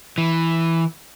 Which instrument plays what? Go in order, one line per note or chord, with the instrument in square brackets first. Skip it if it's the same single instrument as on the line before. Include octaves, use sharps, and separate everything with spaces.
[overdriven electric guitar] E3